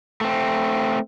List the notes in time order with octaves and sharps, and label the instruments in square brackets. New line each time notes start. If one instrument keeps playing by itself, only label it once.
[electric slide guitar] A3 C4